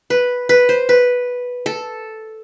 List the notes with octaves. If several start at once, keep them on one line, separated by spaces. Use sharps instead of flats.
B4
B4
C5
B4
A4